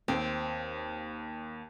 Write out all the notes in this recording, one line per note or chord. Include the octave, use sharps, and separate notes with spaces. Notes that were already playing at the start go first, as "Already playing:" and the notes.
D#2 C4